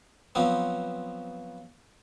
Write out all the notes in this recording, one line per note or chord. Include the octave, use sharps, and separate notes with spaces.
F3 F#3 B3 C4